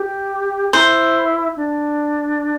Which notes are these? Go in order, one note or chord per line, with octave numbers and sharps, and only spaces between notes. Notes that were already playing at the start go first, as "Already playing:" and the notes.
Already playing: G4
E4 C5
D4